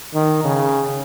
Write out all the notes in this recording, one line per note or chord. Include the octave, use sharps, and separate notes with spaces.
D#3
C#3